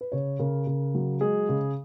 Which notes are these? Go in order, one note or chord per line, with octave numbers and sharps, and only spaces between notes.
B4
C#3 C#5
C#3 A#4
C#3
F#3
G#3 G#4
C#3